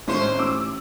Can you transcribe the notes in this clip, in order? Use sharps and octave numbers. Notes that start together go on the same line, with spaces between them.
G#1 C#2 A2 C#4 C5
A1 D6 E6